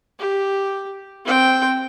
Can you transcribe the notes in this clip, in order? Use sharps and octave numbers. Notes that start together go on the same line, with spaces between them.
G4
C4 G5